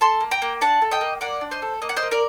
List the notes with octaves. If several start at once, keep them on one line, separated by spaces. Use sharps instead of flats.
A4 A5 C6
A#3
G5 A#5
A#3
D4 F#5 A5
A4
D#5 G5
A#3
A#3 D5 F#5
D4
C5 D#5
A4
A#3 D#5
F#5
C5 D#5
A#3
A#4 D5